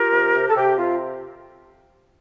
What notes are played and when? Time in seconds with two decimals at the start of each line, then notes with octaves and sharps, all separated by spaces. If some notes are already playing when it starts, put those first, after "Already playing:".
Already playing: F4 G4 A#4
0.13 C3
0.35 C3
0.49 A4
0.56 C3 G4
0.78 C3 F4